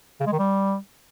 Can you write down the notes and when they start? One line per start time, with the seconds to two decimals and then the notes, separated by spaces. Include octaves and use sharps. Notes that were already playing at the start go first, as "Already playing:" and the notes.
0.20 C#3
0.26 G#3
0.33 D#3
0.39 G3